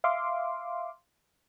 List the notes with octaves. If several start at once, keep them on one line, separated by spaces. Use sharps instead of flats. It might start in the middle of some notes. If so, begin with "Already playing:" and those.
E5 F5 C6 D6